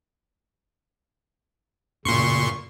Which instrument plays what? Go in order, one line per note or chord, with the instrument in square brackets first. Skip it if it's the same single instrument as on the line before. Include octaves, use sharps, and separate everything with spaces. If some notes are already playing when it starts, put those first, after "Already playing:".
[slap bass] F#2 [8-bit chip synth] A#2 C6 C#6 [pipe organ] C#3